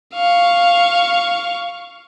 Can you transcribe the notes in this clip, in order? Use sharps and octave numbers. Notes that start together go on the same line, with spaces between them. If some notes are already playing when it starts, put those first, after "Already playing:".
F5 C#6